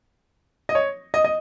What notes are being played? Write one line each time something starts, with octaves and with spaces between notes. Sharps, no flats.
D#5
C#5
D#5
D#5